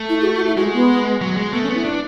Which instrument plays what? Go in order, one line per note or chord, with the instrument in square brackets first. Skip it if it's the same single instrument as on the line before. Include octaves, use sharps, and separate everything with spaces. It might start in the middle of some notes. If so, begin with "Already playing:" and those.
Already playing: [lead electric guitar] A3
[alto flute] E4
G#4
F#4
F#4
E4
[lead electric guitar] G#3 [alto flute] F#4
[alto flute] B3
[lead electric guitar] F#3
G#3
[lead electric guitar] A3 [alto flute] B3
[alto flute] C#4
[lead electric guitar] B3
[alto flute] E4
[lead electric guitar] D4